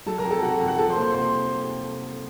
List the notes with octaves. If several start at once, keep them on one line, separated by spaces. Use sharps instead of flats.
F#3 A4 A5
A#4 A#5
F2
A4 A5
C3 F#4 F#5
F2
F#5
F3 A4 A5
C5 C6
A#3
C5 C6
C3 C5 C6